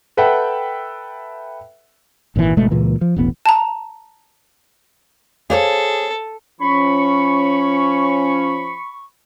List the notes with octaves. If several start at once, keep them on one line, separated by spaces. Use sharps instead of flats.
A4 B4 E5 F#5 G5
G#1 A#2 C#3 E3
G#1 B2 G#3 A3
C#2 A#2 E3 A#3
F3
E1 A1 B3
A5 A#5
G#4 A4 C5 C#5 F5
F3 C#4 B5 C#6